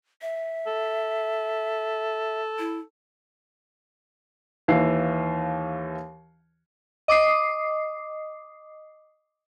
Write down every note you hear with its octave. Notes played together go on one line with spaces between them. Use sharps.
E5
A4
E4
D#2 E3 F5 C7
D#5 D6 D#6 C7